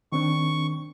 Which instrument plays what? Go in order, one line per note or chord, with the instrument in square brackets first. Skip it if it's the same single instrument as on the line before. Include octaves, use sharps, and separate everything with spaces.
[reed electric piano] D#3 C4 D4 [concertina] C#6